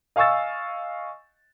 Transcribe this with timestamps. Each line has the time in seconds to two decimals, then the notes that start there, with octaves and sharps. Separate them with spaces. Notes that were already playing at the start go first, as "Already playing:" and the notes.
0.16 D#5 F5 G#5 C#6 E6 A6